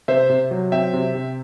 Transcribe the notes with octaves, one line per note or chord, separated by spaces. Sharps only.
C3 C5 E5
C3
F#3
C4 E5 G5
C3
C3